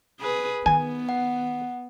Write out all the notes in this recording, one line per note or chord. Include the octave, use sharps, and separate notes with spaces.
G#4 B4
D#3 B3 G#5
F#5